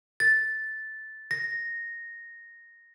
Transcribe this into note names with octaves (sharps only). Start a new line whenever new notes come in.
A6
A#6